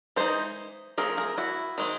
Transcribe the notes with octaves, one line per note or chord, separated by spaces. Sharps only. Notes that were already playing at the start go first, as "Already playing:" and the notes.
E3 G#3 D#4 C5
F3 A3 C4 G#4 A#4
G#4 A#4
E4 F#4
D#3 G#3 C4